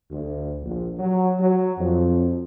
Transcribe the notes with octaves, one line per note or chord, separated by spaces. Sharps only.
D2
A#1
F#3
F#3
F2